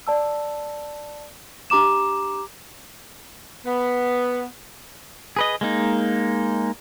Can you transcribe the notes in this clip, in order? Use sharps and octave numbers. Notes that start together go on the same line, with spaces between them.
D5 A5 E6
D4 G4 A#5 D6 E7
B3
G#4 B4 D#5
G#3 A#3 D#4